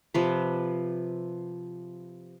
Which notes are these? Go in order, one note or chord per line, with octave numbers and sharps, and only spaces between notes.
C3 F3 B4